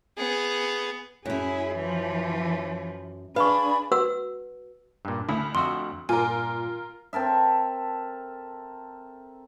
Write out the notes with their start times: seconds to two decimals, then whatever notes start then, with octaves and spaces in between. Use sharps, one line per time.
0.18 B3 G#4
1.26 F#2 C#4 E4 G#4
1.75 E3 F3
3.36 D4 G#4 B4 F5 B5 C#6
3.92 F#4 B4 F#5 E6
5.05 G2 A#2
5.29 D2 E4
5.55 F2 F#4 E5 C6
6.09 G2 A#2 F4 A#4 G#5
7.13 C4 A4 A#4 E5